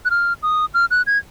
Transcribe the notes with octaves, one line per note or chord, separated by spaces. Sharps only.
F#6
F6
D#6
F6
F#6
G#6